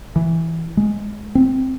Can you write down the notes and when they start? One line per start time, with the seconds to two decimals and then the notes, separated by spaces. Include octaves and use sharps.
0.16 E3
0.77 G#3
1.35 C4